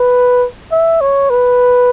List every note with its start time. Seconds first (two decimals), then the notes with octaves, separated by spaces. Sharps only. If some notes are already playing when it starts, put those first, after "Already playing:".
Already playing: B4
0.72 E5
1.01 C#5
1.30 B4